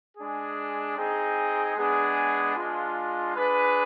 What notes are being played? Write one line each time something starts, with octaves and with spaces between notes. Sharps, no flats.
G#3 D4 G#4
C4 D#4 G#4
G#3 B3 D4 G#4
G#3 D4 F4
D4 G#4 B4